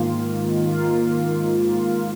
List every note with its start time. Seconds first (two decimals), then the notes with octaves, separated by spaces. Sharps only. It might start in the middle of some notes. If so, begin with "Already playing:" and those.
Already playing: G#2 D#3 A#3 F4
0.72 G#2 D#3 A#3 F4
1.62 G#2 D#3 A#3 F4